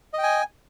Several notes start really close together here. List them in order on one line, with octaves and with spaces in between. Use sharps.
D#5 G5 G#5